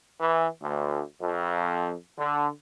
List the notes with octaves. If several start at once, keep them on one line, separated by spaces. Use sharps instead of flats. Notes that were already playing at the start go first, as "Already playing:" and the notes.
E3
D2
F2
D3